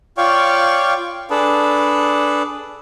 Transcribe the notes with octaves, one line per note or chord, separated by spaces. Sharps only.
F4 C#5 D5 F5 G5 C#6
D4 G#4 A4 B4